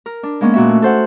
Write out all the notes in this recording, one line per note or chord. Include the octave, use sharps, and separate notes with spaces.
A#4
D4
G#3 A#3 B3 C#4
A#2 F#4 E5
A3
A4 C5 F#5